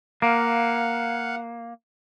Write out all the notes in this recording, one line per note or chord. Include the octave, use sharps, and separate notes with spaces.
A#3 F5 F#5